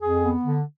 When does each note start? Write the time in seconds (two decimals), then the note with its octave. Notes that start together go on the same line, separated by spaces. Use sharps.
0.01 F2 G#4
0.22 B3
0.44 D3